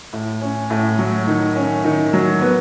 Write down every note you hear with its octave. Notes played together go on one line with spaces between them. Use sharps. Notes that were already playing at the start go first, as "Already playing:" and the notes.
A2
C#4
A2
F#3
D#3
C#4
D#3
F#3
B3